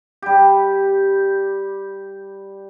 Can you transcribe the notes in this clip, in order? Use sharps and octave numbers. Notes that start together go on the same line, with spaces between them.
G3 G4